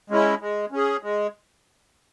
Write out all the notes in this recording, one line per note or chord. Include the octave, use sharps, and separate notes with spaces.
G#3 C#4 E4
G#3
C#4 G#4
G#3